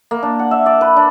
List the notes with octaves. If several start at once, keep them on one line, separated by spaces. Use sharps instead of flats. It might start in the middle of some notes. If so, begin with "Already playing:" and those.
A#3
D4
F#5
E5
D5
B4
D4